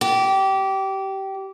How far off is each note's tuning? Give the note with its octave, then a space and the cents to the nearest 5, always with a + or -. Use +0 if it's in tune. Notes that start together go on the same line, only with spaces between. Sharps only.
G4 -20